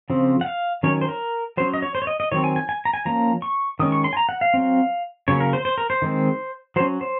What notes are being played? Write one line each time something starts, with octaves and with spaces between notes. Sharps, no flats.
C#3 F3 C4
F#5
F5
D#3 F#3 C#4 C#5
C5
A#4
F#3 C#4 C5
D#5
C#5
C5
C#5
D#5
D#5
D#3 F#3 C4 C#5
G#5
G#5
G#5
A#5
G#5
F3 A#3 C#4 A#5
C#6
D#3 G#3 C#4 D#6
C#6
C6
G#5
A#5
F#5
F5
F#3 C4
C#3 F#3 A#3 C#4 C#5
A#4
C5
C5
A#4
C5
D#3 G#3 C4
F#3 C#4 C5
C5